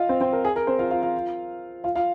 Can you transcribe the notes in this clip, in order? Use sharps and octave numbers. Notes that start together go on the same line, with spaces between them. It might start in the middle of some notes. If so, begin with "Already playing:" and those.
Already playing: F4 D#5 F5
C4 C5
C4 C5
A#4
G#4
A#4
C4 C5
F4 F5
F4 F5
F4 F5
F4 F5
F4 F5